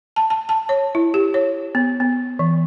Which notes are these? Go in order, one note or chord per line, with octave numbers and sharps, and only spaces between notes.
A5
A5
A5
C#5
E4
G4
C#5
B3
B3
E3